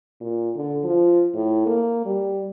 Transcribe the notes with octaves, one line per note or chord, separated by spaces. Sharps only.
A#2
D3
F3
A2
A#3
G3